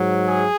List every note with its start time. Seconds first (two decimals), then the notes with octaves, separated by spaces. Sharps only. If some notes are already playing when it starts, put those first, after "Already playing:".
Already playing: G#2 F#3
0.27 G#4